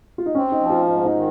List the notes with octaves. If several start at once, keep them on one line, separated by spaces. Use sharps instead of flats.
F4
D#4
C4 C#4
D#4
F3
F4
G#2 D#4
D#4
D#3